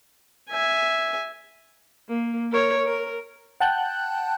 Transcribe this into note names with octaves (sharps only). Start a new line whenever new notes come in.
E5 G#5
A#3
A#4 C#5
A#4
F#5 G5 A5 F#6 G6